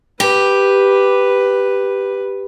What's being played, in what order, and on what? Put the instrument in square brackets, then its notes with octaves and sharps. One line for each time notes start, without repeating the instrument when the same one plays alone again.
[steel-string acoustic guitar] G4 [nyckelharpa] B4